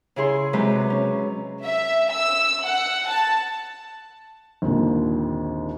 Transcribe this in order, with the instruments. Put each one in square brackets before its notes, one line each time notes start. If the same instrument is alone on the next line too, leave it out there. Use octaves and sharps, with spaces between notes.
[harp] C#3 E4 G#4 C6
C3 F#3 G#3 D#4 B4
C#4
[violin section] E5
E6
F#5
A5
[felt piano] G#1 D#2 A#2 D3